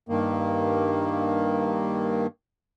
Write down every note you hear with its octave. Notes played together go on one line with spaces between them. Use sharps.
G2 D#3 A#3